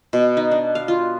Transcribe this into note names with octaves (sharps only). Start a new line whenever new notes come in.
B2
D#4
D4
F5
F4